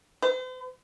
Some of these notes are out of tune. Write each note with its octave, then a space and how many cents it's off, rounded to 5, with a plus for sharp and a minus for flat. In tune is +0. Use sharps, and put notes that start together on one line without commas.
C5 -45